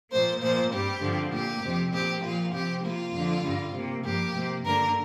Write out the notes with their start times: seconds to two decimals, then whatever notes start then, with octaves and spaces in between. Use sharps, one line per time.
0.11 A#2 F3 A#3 C5
0.41 A#2 F3 A#3 C5
0.71 G2 G3 C4 G4
1.02 G2 D3 F3 C4
1.32 A#2 A#3 G4
1.63 F2 C3 F3 C4
1.92 A#2 F3 C4 G4
2.22 A#2 F3 A#3 F4
2.53 C3 F3 C4 G4
2.83 C3 A#3 F4
3.13 F2 D3 F3
3.44 G2 D3 G3
3.73 C3 A#3
4.03 G2 F3 A#3 G4
4.34 C3 A#3
4.64 G2 D3 A#3 A#4